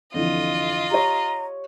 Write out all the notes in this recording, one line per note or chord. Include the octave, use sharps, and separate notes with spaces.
F2 D3 E3 F4 D#5
G4 C#5 A#5